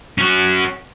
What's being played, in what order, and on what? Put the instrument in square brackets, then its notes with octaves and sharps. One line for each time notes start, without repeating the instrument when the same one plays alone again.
[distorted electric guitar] C#4 F#4